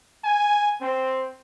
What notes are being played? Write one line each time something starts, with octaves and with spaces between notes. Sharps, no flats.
G#5
C4